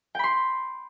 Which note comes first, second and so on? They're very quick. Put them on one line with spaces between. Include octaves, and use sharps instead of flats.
G5 B5 C6